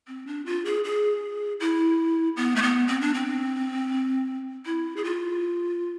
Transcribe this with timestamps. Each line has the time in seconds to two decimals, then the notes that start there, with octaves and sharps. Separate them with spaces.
0.07 C4
0.27 D4
0.46 F4
0.65 G#4
0.84 G#4
1.60 E4
2.37 B3
2.56 A3
2.62 B3
2.88 C4
3.01 D4
3.14 C4
4.66 E4
4.96 G#4
5.04 F4